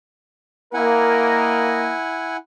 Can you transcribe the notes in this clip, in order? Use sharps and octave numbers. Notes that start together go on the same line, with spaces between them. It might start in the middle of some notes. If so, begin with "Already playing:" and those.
A#3 E4 A#4 D#5 F#5 G#5